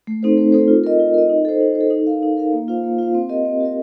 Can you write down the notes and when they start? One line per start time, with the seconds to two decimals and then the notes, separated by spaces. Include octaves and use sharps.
0.07 A3
0.23 C4 D#4 A4 C5
0.37 A3
0.52 C4 D#4 A4 C5
0.68 F4
0.84 A#4 D#5
1.00 F4
1.14 A#4 D#5
1.29 D#4
1.45 A4 C5
1.61 D#4
1.75 C5
1.81 A4
1.91 D#4
2.07 A#4 F5
2.23 D#4
2.37 A#4 F5
2.53 A#3
2.68 F4 C5 F5
2.84 A#3
2.99 F4 C5 F5
3.15 C4
3.29 G4 A#4 D#5
3.45 C4
3.60 G4 A#4 D#5